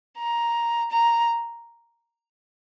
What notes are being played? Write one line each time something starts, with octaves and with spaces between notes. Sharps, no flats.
A#5
A#5